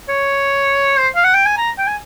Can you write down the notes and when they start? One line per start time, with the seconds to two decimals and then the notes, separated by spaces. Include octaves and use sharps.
0.09 C#5
0.98 C5
1.15 F5
1.24 F#5
1.34 G5
1.46 G#5
1.57 A#5
1.78 G5
1.87 G#5